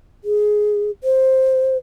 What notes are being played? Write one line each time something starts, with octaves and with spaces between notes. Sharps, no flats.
G#4
C5